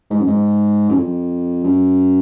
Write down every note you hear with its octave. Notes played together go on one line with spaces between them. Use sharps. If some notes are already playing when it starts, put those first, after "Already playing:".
G#2
F#2
G#2
F#2
F2
F#2